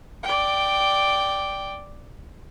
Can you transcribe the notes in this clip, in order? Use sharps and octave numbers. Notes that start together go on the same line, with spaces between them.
D5 G5